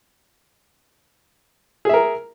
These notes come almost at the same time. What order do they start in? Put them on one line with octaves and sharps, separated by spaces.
G#4 E5 A#4